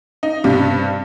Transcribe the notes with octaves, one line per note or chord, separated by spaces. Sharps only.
D#4
G2 C3 G3